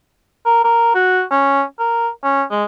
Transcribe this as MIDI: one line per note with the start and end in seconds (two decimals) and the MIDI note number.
0.46 0.63 70
0.64 0.94 70
0.95 1.22 66
1.31 1.63 61
1.79 2.08 70
2.24 2.43 61
2.51 2.64 56